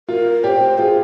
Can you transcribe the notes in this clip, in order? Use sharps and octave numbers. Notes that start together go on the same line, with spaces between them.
F4 A#4
G4 C5 D5
F4 G#4